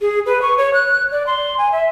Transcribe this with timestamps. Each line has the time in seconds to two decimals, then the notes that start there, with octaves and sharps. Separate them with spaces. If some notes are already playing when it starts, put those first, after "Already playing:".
0.01 G#4
0.26 B4
0.42 C#6
0.58 C#5
0.74 F#6
1.12 D5
1.27 C6
1.58 G#5
1.72 E5